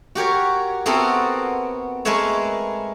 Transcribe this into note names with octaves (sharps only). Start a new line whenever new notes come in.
F#4 G4 A#4 C#5
B3 C4 E4 F#4 A4 A#4
G#3 A3 A#4 B4 C#5 E5